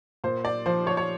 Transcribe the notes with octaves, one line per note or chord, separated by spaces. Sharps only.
A#2 C5
D5
F3 C5
C#5
C#5